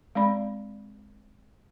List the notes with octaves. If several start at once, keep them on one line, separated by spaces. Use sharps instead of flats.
G#3 C4 D5 B5